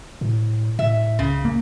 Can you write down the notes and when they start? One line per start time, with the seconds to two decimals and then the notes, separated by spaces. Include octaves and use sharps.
0.21 A2
0.79 A2 E5
1.19 C#2 C#3
1.45 A#3